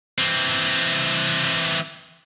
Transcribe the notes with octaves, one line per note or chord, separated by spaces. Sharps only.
E3 C4